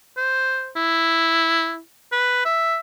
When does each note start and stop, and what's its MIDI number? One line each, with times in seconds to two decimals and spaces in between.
0.17 0.70 72
0.76 1.79 64
2.12 2.41 71
2.45 2.78 76